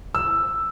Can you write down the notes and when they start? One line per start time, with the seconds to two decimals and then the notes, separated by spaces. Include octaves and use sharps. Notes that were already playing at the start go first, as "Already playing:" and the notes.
0.15 E6